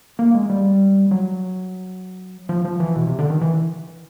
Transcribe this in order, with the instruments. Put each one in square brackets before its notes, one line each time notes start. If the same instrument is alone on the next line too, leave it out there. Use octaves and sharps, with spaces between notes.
[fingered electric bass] A#3
G#3
G3
F#3
F3
F3
E3
B2
C3
D3
D#3
E3